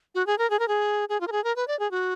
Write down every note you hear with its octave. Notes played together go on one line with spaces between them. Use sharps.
F#4
G#4
A#4
G#4
A#4
G#4
G#4
F4
A#4
G#4
A#4
B4
D5
G#4
F#4